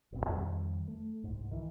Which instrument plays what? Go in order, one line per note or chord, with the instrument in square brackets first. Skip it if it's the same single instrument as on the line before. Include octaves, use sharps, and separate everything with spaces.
[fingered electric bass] D#1 B1 C4
F2 D#3 G3
A3
C2 G#2
D#3 E3